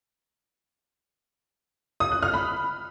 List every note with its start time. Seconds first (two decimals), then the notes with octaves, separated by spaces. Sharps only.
2.00 D#6
2.11 F#6
2.23 F6
2.34 B5